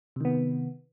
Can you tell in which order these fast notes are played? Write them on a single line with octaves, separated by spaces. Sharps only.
C3 D#3 B3